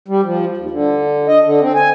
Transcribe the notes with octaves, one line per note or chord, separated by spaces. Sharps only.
G3
F3
D#2
D3
D#5
D3
C4
G#5